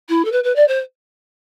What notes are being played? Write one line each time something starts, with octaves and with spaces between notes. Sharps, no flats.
E4
A4
B4
B4
D5
C5